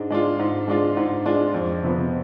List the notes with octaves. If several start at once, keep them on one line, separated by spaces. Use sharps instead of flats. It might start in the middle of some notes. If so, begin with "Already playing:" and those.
Already playing: G#2 G#3 D4
G#3 D4 F4
G#2
G#3 D4 F4
G#2
G#3 D4 F4
F2
C3 F3 B3